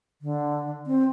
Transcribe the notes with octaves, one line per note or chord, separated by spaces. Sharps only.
D3
C4